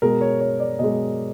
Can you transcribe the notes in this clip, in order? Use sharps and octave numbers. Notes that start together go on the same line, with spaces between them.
B2 G#3 A#4
C#5
C#5
D5
B2 G#3 D#5